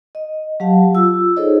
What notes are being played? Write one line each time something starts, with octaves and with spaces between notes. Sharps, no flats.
D#5
F#3 G4 F5 A5
F4 E6
D#4 G#4 A4 C5 C#5 D#5